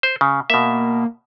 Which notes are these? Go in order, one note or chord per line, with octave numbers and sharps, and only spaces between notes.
C5
C#3
B2 A#3 E5